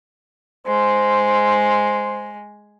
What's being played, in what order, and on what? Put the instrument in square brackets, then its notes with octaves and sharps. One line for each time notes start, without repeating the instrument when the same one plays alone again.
[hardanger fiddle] G#3 [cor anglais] C5